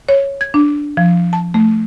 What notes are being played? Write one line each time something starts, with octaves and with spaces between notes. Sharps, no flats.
C#5
G#6
D4
F3
A5
A3